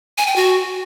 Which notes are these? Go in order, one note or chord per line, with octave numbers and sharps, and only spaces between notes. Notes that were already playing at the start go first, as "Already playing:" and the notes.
G#5
G5
F#4